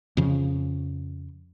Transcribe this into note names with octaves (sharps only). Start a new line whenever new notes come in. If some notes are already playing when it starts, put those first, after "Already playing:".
F2 C#3 F3